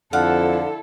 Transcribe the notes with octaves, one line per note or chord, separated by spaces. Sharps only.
F2 D3 E4 A4 F5 F#5